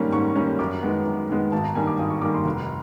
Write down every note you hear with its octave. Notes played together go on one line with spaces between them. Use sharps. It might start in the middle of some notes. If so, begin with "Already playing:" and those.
Already playing: G#2 D#3 G3 A#3 C#4
G#2 C#6
D#3 G3 A#3 C#4
F#2 D6
D#3 G#3 B3
F#2
D#3 G#3 B3
G#1 A5
A#5
G2 D#3 G3 A#3 G#5
D6
G#1 D#6
C#6
G2 D#3 G3 A#3 D6
C6
F1